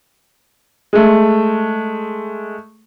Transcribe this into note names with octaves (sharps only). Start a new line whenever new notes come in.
G#3 A3